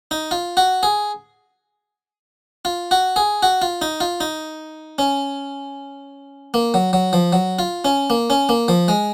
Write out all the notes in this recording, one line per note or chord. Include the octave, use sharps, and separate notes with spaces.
D#4
F4
F#4
G#4
F4
F#4
G#4
F#4
F4
D#4
F4
D#4
C#4
A#3
F#3
F#3
F3
F#3
F4
C#4
A#3
C#4
A#3
F3
G#3